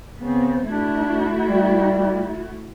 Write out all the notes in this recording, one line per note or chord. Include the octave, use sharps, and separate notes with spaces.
C#3 B3 C4
A3 D4 E4 F#4
G3